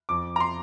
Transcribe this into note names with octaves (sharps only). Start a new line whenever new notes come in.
F2 D6
A#5
C6